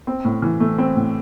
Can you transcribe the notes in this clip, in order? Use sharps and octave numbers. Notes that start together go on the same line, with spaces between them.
C4
A2
E3
A3
C4
A2